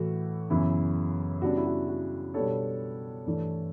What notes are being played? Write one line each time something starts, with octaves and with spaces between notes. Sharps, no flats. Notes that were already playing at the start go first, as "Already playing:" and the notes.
Already playing: A2 E3 A3 F#4
F#2 C#3 E3 B3 E4
C#3 G3 B3 D4 F#4
E4
F#4
F#4
B2 G3 B3 D4 A4 C#5
G2 E3 A3 D4